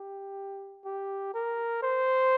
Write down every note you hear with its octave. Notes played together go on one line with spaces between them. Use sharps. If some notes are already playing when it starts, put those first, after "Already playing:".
Already playing: G4
G4
A#4
C5